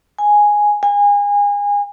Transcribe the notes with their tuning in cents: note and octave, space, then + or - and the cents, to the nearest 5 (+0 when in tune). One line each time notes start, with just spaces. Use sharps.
G#5 +0
G#5 -30